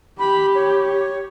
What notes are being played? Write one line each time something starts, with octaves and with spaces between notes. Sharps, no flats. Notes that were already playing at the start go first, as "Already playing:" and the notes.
G4 B5
C#5